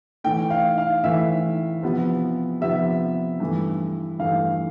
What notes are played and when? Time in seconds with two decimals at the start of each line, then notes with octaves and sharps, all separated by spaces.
0.24 A2 E3 A3 G5
0.50 F5
0.78 F5
1.04 A2 E3 A3 E5
1.82 C3 F3 B3
2.61 C3 F3 B3 E5
3.40 G2 E3 A3
4.19 G2 E3 A3 F5